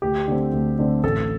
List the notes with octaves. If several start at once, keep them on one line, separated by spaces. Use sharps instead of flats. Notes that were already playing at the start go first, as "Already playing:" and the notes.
D2 G4
D3 A3 C4
D2
D3 A3 C4
A1 A4